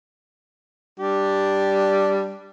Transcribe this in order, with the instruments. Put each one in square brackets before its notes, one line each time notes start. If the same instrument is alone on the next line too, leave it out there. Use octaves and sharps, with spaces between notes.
[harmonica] G3 D4 G4